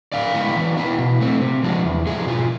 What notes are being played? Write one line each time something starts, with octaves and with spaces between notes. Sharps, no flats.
D3 D5 F5
G#3 B3 E4
E3
B3 E4
B2
A3 C4
C3
F3 G#3 D4
E2
D3 F3 G#3 G#4
B2 F4